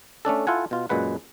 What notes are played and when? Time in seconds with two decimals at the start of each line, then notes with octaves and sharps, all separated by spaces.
0.25 A3 C#4 D4 A4
0.47 E4 F4 A4 F#5 G#5
0.71 B2 F4
0.89 F#2 A#2 G#3 B4 F#5